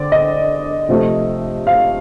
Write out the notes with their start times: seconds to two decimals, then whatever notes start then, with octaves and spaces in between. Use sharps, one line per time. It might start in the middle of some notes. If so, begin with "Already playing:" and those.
Already playing: D3 C4 D5
0.12 D#5
0.89 C3 F3 A3
1.67 F5